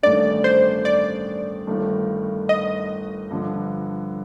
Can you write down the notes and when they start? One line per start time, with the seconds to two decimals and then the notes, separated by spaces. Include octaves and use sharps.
0.03 A1 G2 D#3 A3 D4 D5
0.44 C5
0.85 D5
1.67 G1 G2 D#3 A3
2.49 D#5
3.31 G2 D3 F3